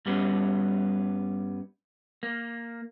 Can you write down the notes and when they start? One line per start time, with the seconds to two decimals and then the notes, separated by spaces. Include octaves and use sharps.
0.06 G2 G3 B3 C#4
2.23 A#3